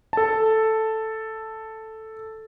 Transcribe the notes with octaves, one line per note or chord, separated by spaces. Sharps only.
A4 A5